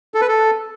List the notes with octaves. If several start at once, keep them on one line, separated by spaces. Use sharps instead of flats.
A4
B4
A4